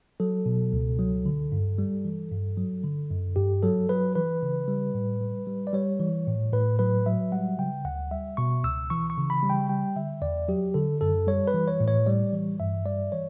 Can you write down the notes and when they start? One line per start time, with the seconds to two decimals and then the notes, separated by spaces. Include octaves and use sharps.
0.20 F#3 A4
0.46 B2
0.73 C#2
0.99 F#3
1.26 D3
1.52 G2
1.78 G3
2.05 E3
2.31 G2
2.57 F#3
2.83 D3
3.11 F#2
3.36 G2 G4
3.63 F#3 A4
3.89 F#3 B4
4.15 E3 B4
4.43 C#3
4.68 G3
4.94 A2
5.21 G3
5.47 G3
5.67 D5
5.73 G3 C#5
6.00 E3
6.27 A2
6.53 A2 B4
6.79 F#3 B4
7.06 F#3 E5
7.32 G3 F#5
7.58 C#3 G5
7.85 D2 F#5
8.11 G3 E5
8.37 B2 C#6
8.64 C#2 E6
8.90 E3 C#6
9.10 C#6
9.17 C#3
9.30 B5
9.43 G3
9.50 G5
9.69 G3 G5
9.96 D3 E5
10.22 E2 D5
10.48 F#3 G4
10.74 D3 A4
11.01 F#2 A4
11.27 G3 C#5
11.48 B4
11.54 E3
11.68 C#5
11.80 A2
11.88 C#5
12.06 G3 D5
12.33 E3
12.60 G2 E5
12.86 G3 D5
13.12 E3 C#5